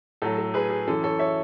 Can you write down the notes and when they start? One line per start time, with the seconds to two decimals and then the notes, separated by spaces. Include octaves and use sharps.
0.22 A2 F#3 A4
0.38 A4
0.54 G#4 B4
0.70 G#4
0.87 F#2 E3 A4
1.03 A4 C#5
1.19 C#5 E5